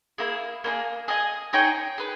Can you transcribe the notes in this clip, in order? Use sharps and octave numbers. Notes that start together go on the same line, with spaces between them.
A#3 E4 G#4
A#3 D#4 G#4
G#4 D#5 G#5
D#4 G#4 C#5 G5
G#4 B4